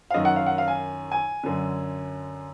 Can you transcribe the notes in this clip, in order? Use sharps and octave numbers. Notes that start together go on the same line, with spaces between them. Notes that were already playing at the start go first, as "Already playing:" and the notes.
F5
F#2 D#3 D#5
F#5
F5
F#5
F5
G#5
G#5
F#2 D3